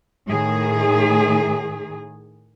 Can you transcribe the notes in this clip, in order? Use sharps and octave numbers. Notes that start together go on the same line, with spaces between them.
A2 D#3 G#4